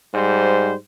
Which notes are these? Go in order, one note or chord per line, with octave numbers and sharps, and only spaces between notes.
G#2 G3 C5